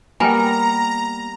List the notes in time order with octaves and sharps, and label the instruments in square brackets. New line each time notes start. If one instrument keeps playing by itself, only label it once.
[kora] G3 B3 A#4 [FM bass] A#3 [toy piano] G5 G#5 [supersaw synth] A#5